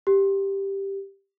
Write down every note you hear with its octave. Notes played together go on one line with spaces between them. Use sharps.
G4